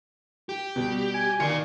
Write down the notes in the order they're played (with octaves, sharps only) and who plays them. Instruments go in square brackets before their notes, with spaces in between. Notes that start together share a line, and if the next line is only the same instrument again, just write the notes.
[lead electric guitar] G4
[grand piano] B2 G3
[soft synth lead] G#5
[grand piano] D#3 C#7 [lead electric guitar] F4 D5